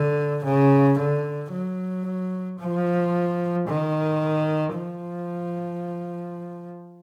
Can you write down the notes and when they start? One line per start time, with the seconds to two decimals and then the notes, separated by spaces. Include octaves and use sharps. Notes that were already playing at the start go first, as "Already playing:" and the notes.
Already playing: D3
0.44 C#3
0.98 D3
1.52 F#3
2.59 F3
3.68 D#3
4.75 F3